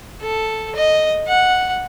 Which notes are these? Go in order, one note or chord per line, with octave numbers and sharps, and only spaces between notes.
A4
D#5
F#5